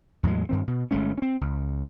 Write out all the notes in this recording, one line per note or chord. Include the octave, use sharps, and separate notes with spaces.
E2 A2 F#3 G#3
G2 D#3 C4
B2
G1 G#3 A3 C#4
C4 C#4
C#2